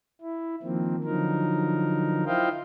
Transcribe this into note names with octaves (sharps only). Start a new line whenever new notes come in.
E4
D#3 F3 A#3 C4
D3 F3 F#3 D#4 A#4
E4 F4 C5 D#5 F5 G5